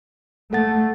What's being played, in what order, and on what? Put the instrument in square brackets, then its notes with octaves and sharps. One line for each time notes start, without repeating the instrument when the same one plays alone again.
[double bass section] A3 [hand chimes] A4 F#5 A6